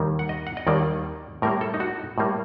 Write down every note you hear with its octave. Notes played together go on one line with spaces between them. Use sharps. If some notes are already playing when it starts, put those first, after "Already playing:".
Already playing: D#2 D#3 G3 A#3
F#5
D#5
F#5
D#5
D#2 D#3 G3 A#3 D5
A2 G3 A#3 A#4
A4
D#4
F#4
A2 G3 A#3